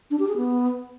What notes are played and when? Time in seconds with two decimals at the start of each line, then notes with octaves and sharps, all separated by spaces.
0.11 D4
0.19 G4
0.28 G#4
0.37 B3